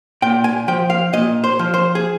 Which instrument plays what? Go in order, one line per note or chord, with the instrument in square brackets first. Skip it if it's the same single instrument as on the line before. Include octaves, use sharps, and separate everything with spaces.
[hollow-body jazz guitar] A#2 G5
G#5
F3 G5
F5
A#2 D#5
C5
F3
C5
G#4